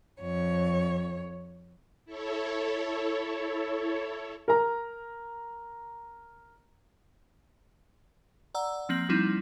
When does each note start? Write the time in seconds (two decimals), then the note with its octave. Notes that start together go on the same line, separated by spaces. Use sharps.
0.21 F2 C#5
2.05 E4 A4 C#5
4.48 A#4 A#5
8.55 D5 F#5 A#5 E6
8.89 F3 A#3 C4 A#6 F#7
9.09 F3 G3 C4 D#4 E4